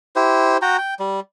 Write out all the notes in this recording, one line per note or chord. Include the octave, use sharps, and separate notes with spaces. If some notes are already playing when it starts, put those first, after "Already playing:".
E4 G4 C5
F#4 G5 A#5
G5
G3